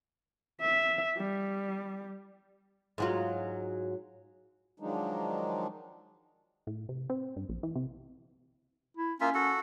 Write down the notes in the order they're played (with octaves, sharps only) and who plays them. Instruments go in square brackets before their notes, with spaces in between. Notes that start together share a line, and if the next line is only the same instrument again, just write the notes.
[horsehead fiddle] E5
G3
[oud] G#2 F#3 F4
[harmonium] D#3 F3 F#3 G#3 D4 D#4
[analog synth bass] A2
C3
C4
G2
A#1
E3
C3
[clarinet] E4
[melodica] A#3 F4 E5 [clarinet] C#4
[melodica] F#4 A4